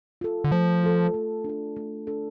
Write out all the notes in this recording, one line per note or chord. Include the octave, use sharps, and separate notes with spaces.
F4 A4
D3
F3 A3
F4 A4
A3
D4 A4
A3
D4 A4